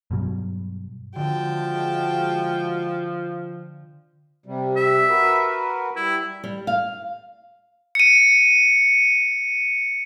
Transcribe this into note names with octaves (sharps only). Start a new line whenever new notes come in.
G2 B2 F#3
D3 F3 G#3 F#4 D#5 G5 A5
C3 G3
E5
F#4 A#4 B4
G3 E4
G3
F5
C#7 D#7